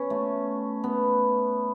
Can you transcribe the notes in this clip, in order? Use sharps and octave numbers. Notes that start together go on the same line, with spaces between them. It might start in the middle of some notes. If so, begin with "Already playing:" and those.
Already playing: B3 C#4
A3
B3